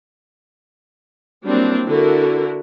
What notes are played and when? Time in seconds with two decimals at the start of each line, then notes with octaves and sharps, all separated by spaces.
1.46 F#3 G3 A#3 C4 D4 E4
1.86 D3 E4 F#4 A#4